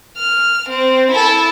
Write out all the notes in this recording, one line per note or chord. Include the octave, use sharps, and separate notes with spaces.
F6
C4
E4 A4